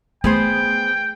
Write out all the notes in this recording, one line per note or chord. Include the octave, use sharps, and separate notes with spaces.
A3 B3 G#4 C5 G5